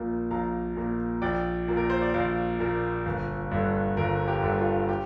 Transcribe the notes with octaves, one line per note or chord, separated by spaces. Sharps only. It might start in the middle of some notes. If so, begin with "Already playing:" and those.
Already playing: A#1 A#2 A#3
A#1 F5 A#5
A#2 A#3
A#1 D5 G5
A#2 A#3
A#4
C5
D5
A#1 C5 F5
A#2 A#3
G1
G2 D3
G1 F4 A#4
G4
G2 D3
F4
G4